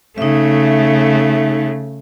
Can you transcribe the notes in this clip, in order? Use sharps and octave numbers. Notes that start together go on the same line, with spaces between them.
C#3 A3 D#4 E5